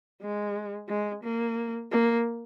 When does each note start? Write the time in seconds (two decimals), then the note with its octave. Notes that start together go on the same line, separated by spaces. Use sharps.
0.22 G#3
0.88 G#3
1.23 A#3
1.91 A#3